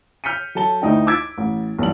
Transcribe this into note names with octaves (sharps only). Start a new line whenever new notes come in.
F6 G6 B6 C#7 D#7
F#3 A4 A5 G7
D2 D#4 E4 G5
D6 E6 G#6 A6 B6 D7
A1
B1 E3 G3 F#7